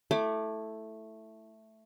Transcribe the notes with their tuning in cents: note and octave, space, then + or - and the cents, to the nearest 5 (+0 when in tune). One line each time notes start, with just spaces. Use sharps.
A3 +0 E4 +0 D6 +25